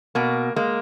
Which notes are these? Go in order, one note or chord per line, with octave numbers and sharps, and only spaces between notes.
B2 A#3
G#3 A#3